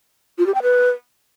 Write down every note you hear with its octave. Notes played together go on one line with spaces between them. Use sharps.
F4
G4
G5
B4